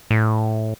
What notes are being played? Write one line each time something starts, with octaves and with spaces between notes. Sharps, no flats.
A2